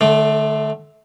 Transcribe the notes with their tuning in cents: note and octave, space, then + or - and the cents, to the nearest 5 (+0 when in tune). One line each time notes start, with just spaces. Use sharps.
D3 +25 A3 -20